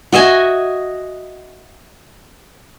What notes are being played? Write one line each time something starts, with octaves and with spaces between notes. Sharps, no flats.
F#4 D#5 E5 G#5